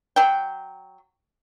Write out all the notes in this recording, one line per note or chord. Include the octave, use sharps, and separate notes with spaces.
F#3 G5